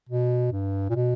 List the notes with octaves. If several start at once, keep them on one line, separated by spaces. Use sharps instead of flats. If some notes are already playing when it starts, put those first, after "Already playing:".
B2
G2
A#2
B2